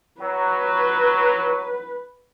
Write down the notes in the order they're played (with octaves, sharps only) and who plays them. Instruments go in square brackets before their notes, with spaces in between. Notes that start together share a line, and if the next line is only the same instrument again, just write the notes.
[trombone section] F#3 [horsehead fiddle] B4